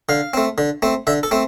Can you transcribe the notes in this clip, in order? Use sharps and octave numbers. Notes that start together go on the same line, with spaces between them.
D3 F5
A3 C4
D3
A3 C4
D3 E5
A4
A3 C4